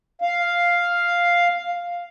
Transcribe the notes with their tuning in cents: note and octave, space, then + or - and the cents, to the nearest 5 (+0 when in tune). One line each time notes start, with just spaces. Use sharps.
F5 +0